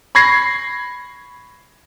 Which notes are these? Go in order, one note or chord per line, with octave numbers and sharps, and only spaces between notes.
B5 C#6 G#6 A#6 C7